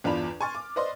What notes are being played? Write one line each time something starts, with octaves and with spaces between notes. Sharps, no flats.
G1 E2 D4 F4 B5 F7
G#5 C6 C#6 F6 A6
D6
B4 C5 D5 D#5 C6